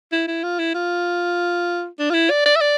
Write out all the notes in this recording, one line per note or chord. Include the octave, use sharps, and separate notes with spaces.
E4
E4
F4
E4
F4
D4
F4
E4
D5
D5
E5
D5